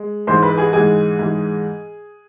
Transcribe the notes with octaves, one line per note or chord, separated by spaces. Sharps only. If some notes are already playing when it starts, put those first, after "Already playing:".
Already playing: G#3
G#2 E3 G#3 C5 C6
B4 B5
G#4 G#5
G#2 E3 G#3 G#4 G#5
G#2 E3 G#3